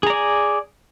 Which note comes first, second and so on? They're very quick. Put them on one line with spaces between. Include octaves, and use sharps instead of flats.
G#4 A#5 D5 G#5